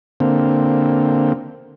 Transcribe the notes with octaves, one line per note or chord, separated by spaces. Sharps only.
D3 A#3 C4